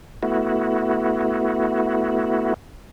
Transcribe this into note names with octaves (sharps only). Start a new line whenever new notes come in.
A3 B3 E4 F#4